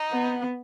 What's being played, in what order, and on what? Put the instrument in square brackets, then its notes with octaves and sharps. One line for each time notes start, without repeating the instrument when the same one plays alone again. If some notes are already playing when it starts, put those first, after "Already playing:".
Already playing: [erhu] D#4
[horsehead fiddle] B3